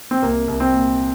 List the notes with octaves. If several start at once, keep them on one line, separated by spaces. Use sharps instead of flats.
C4
C2 A#3
C2
C4
A#2